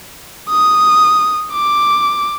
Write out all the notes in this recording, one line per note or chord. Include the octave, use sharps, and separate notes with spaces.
D#6
D6